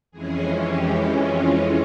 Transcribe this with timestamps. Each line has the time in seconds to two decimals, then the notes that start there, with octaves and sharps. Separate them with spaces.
0.11 F2 E3 G#3 C#4 G#4
0.63 G4
1.15 F4